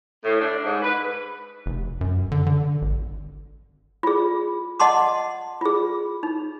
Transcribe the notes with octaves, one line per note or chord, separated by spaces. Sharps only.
A2
D4
G#2
B4
F1
F#2
D3
D3
G#1
F4 G#4
D#5 F#5 A5 C6 D6
F4 G#4
D#4